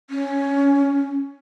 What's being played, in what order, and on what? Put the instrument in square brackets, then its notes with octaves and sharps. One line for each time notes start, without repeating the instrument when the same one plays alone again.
[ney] C#4